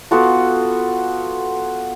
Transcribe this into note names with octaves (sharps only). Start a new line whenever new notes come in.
B3 F4 F#4 A4